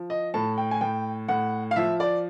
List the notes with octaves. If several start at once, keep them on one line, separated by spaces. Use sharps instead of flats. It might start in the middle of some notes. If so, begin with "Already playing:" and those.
Already playing: F3
D#5
A2 A5
G5
G#5
A2 G5
A2 F#5
F5
F3 E5
D5